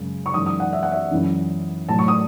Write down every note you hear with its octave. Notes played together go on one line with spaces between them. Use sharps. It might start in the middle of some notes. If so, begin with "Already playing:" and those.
Already playing: F#2 C#3 G#3
C#6
F#2 E3 G#3 D#4 D#6
D#6
F#5
E5
F#5
E5
F#2 E3 G#3 C#4 E4
A2 F#3 A3 A5
C#6
D#6